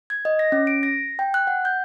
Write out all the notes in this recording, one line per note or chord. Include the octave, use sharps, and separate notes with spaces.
G#6
D#5
A#6
C#4
D7
A#6
G5
F#6
F#5
G6